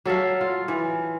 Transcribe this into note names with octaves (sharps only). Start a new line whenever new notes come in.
F#3 A4 E5 F5
F4
E3